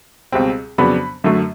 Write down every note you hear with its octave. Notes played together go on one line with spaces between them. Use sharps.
C#2 B2 G3 C4
F2 C#3 F#3 B3 D4 B5
F#2 D3 F#3 A3